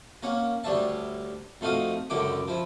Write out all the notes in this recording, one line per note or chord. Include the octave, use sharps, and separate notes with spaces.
A#3 C#4 C#5 F#5
D2 G3 D4 C#5 E5 A5
F2 A3 D#4 F#4 F5 D#6
C#2 F#2 D3 E4 G5 D6
F3 E4